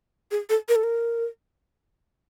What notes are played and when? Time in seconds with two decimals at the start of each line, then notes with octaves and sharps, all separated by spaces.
0.31 G#4
0.49 A4
0.69 A#4
0.76 A4
0.83 A#4